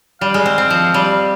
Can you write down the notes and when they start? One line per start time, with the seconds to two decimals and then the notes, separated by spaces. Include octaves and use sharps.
0.21 G3 F5
0.34 G#3
0.46 C4
0.58 C4
0.70 F3
0.94 G3